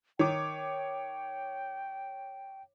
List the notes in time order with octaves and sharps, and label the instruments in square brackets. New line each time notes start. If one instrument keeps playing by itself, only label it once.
[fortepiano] D#3 [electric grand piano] C#5 D6 [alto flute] G5